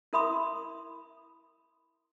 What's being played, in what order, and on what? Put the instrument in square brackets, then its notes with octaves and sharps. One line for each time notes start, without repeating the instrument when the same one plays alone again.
[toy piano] E4 A#4 E5 B5 C6 D#6